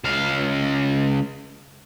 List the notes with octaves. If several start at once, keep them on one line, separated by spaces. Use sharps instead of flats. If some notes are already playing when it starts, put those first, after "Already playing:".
C#2 F5